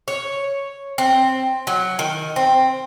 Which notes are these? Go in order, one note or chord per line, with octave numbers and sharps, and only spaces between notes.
C#5
C4
F#3
D#3
C4